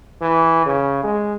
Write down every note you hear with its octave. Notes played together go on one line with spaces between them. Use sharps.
E3
C#3
G#3